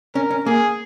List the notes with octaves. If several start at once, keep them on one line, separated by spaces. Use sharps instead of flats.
C#4 A#4
C#4
A#3 G#4